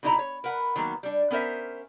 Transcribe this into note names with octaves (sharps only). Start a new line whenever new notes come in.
B2 D3 D#4 E4 D#5 A#5
C#5
A#4 B4 F#5
D#3 F#3 A#3 B3
G3 D4
B3 C#4 A#4 C5 E5